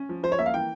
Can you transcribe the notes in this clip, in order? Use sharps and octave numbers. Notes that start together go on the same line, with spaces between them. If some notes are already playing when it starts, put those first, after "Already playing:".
Already playing: C#4
F3
F3 C5
C#5
A#3 E5
F5
E3 G5